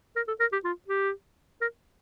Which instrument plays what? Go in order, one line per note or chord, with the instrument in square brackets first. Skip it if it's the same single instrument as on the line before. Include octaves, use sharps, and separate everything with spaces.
[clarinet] A#4
A4
A#4
G4
F4
G4
A#4